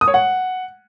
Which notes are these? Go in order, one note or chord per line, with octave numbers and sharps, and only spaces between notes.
D#6
C#5
F#5